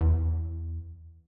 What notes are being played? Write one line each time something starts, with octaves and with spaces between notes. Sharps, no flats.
E2